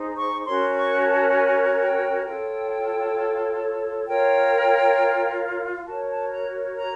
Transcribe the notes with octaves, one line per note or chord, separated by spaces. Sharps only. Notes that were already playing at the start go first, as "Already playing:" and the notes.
Already playing: D#4 G#4 C5
C#6
C#4 F#4 A#4 C#5 C6
C#6
G#5
A5
G#5
G5
F4 A4 C#5 G5
F4 A#4 C#5 G5
F#4 A#4 C#5 A5
A5
A#5
A#5